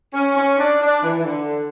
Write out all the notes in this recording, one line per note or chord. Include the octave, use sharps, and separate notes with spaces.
C#4
C#4
D4
D4
E3
E3
D3